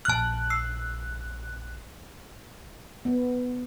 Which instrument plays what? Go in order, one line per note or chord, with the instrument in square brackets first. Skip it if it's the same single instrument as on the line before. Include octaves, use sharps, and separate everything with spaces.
[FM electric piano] A#1 F#6 [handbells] A5 F6
[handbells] E6 C7
[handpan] B3